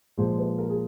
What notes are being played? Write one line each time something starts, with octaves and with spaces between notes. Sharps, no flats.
A#2 F3 G#3 C5
B4
A#4
G#4